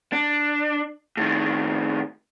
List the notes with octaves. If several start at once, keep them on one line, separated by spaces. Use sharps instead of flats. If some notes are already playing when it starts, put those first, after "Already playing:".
D4
A2 D#3